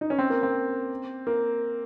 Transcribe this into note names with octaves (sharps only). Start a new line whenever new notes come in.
D#4
C#4
C4
A#3
C4
A#3